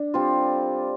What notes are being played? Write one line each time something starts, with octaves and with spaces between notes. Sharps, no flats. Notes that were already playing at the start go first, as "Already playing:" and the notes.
Already playing: D4
G3 C4 F4 A4